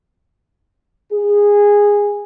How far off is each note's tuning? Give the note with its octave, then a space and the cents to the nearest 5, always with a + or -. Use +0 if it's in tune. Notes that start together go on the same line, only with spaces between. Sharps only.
G#4 -15